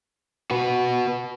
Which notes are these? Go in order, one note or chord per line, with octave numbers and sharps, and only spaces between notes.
F#4 B4